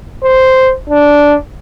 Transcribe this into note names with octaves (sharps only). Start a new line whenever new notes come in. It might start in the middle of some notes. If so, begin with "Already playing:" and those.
C5
D4